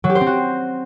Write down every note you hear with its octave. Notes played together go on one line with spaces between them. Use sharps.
F#3
G4
C5
C4
F#4